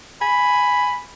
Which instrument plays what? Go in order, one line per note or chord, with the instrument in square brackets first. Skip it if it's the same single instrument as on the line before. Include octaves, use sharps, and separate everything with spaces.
[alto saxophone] G#5 [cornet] B5